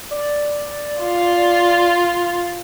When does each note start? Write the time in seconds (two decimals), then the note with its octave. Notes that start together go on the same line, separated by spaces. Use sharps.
0.11 D5
1.02 F4